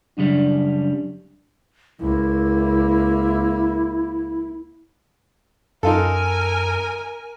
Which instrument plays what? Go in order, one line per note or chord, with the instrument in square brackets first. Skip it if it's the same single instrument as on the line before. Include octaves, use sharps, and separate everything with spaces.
[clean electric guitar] F#2 C#3 G3 [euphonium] D4
[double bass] C#2 A#3 [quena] E4
[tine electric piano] F#2 [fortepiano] D#4 F4 A4 [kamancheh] A#4 G#5